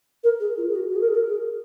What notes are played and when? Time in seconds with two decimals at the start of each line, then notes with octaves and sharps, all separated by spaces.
0.23 A#4
0.40 G#4
0.57 F4
0.69 G#4
0.75 F#4
0.89 F#4
0.95 G#4
1.01 A#4
1.08 G#4
1.14 A#4
1.26 G#4